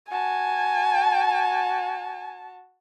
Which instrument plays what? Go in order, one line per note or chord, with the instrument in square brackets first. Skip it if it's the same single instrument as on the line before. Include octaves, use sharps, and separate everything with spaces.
[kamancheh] F#4 A5 [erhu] G#5